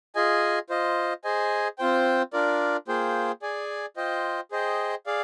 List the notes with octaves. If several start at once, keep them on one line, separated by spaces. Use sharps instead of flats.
F4 G#4 D#5 G#5
F4 C5 D#5
G#4 C5 D#5 G#5
C4 F4 C5 G5
D4 F4 A#4 D5
A#3 F4 G#4 C5 G5
G#4 D5 G#5
F4 C5 D#5 G5
G#4 C5 D#5 G5
G#4 D5 F5